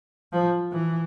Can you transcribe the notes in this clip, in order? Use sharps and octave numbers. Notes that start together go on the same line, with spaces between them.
F3
E3